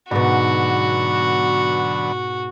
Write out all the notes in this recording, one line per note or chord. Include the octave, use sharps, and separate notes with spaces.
G#2 B2 D3 F#3 B3 F#4